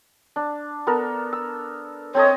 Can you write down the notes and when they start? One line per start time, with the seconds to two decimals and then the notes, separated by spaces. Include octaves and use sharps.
0.36 D4
0.87 B3 A4 A#4
1.33 E6
2.15 C4 A4 C#5 D#5